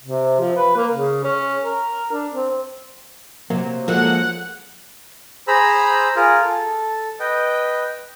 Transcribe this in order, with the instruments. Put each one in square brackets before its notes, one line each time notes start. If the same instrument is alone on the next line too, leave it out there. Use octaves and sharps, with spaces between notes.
[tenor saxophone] C3
F3
B4
A#3
C#3
C#4
A#4
D4
C4
[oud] C3 [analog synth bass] F#3 [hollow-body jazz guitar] A#3
[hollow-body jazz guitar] F3 G#3 [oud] A#3 A4 [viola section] F#5
[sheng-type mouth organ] G#4 C5 A#5 B5 E6
F4 G#4 A#4
A4
B4 D#5 G5